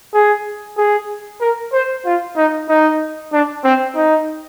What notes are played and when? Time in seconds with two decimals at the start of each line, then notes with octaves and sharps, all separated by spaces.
0.14 G#4
0.77 G#4
1.41 A#4
1.73 C5
2.06 F4
2.37 D#4
2.69 D#4
3.33 D4
3.64 C4
3.96 D#4